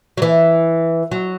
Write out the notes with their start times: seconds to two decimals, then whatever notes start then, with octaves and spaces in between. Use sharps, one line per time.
0.17 F#3
0.22 E3
1.12 F#3